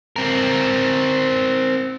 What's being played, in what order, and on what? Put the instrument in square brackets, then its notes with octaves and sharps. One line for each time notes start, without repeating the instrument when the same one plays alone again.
[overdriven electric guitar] C4 A#4